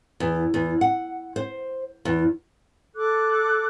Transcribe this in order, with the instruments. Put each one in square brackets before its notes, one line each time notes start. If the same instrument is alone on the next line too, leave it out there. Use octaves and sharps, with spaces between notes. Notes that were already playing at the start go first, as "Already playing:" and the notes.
[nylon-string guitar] E2
E2
F#5
C5
E2
[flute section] A4 D6 F#6